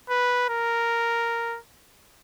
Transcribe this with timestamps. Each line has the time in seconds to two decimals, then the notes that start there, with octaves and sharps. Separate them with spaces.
0.10 B4
0.50 A#4